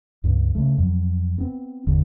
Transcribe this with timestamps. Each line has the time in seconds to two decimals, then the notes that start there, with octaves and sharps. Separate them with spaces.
0.24 C#2 G2
0.55 C#3 A3
0.78 F2 F#3
1.38 B3 C4
1.87 G1 E2 D3